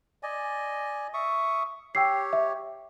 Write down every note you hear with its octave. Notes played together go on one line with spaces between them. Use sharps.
D5 D#5 G#5
E5 C#6 D#6
G4 C#5 G5 E6 C7
E5